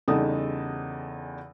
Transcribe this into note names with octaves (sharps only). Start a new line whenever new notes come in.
E2 C#3 G3 D#4 A4 D#6